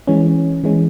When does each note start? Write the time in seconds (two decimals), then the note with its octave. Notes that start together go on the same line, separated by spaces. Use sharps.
0.07 E3 G#3 C#4
0.64 E3 G#3 C#4